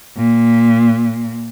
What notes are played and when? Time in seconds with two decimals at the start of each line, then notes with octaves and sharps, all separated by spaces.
0.17 A#2